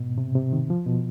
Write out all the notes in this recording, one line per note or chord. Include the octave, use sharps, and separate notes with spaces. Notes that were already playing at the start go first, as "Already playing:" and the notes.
Already playing: G#2 B2
C3
C3
D#3
F3
B2